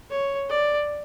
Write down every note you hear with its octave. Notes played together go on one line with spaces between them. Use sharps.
C#5
D5